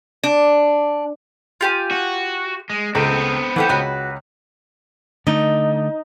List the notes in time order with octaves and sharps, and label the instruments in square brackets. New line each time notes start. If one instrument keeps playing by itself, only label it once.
[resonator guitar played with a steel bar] D4
[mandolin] F4 G4 G#5
[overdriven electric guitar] F#4
G#3
[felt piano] C#2 [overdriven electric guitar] B3 C4 [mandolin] A4
[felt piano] E3 [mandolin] G4 A4 F#5
[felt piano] C#2 C#5 [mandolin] F#4 B4
[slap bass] D3 A3 [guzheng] D#4